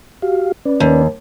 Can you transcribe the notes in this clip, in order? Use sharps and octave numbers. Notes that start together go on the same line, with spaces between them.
F#4 G4 F5
C#4 B4 D5
D#2